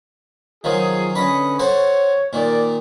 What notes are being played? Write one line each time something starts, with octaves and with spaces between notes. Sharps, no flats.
D#3 F3 F#3 F4 G#4
D3 C#4 B4 D#5 B5
F#4 A4 C5 C#5
A#2 D#3 A#4 D5